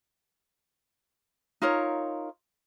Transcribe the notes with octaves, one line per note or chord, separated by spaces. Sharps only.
D#4 F4 A#4 C#5